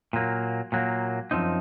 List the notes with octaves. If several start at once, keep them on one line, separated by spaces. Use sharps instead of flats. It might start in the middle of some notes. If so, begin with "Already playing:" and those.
A#2 F#3 A#3
A#2 F#3 A#3
F#2 F3 C4 D#4